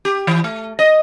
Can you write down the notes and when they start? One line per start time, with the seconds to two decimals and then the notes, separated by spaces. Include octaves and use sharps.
0.05 G4
0.27 E3
0.44 A3
0.79 D#5